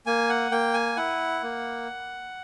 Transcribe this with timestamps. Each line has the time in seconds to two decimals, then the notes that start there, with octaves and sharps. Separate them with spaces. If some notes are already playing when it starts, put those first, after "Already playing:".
0.07 A#3 G#5
0.29 F#5
0.51 A#3 G5
0.74 G#5
0.96 E4 F#5
1.43 A#3